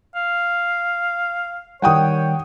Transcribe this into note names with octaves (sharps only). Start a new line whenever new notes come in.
F5
D#3 G3 C#5 F#5 G5 D#6